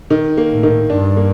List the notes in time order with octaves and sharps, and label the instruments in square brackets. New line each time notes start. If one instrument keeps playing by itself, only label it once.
[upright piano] D#3
A#3
[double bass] A2
[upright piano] D#3
[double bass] G2 [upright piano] D4
[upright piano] A#3